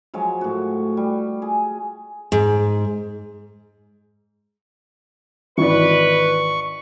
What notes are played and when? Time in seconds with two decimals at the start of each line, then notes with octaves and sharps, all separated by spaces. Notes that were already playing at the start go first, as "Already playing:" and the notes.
0.14 F3 F#3 G#3
0.41 A2 F#4
0.97 G3
1.42 G#4
2.32 G#2
5.58 G#1 E3 B4 D5 C#6